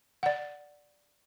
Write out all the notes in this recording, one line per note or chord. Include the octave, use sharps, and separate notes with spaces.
D5 F#5